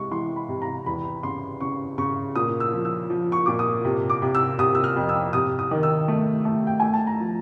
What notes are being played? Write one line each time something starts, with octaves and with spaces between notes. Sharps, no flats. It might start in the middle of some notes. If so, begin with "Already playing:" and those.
Already playing: C3 G#3 C#6
E3 C6
B5
C3
A#5
E2 B5
C#3 C6
C#3 C#6
C#3 C#6
A#2 D#6
E6
F3
E6
F3
C#6
A#2 D6
D#6
C3
D6
C3
E6
C3 D#6
E6
F6
F2
E6
C3 D#6
D#6
D#3
E6
A3
A3
G5
A3 G#5
A5
A#5
F3